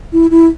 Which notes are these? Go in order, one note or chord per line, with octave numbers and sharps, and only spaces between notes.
E4
E4